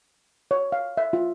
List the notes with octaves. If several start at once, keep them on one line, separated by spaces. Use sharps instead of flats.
C#5
F5
E5
F4